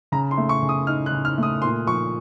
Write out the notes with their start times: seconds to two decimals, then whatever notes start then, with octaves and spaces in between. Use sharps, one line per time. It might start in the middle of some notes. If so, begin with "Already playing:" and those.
0.12 C#3 A#5
0.31 C6
0.38 A3
0.49 C#6
0.62 C#3
0.69 D#6
0.87 D#4 F6
1.06 F#6
1.12 C#3
1.25 F6
1.38 A3
1.43 D#6
1.62 A#2 C6
1.87 F3 C#6